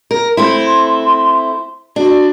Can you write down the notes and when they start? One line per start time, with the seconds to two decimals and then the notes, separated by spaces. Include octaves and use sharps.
0.11 A#4
0.37 A3 C4 E4 C6
1.96 D4 F#4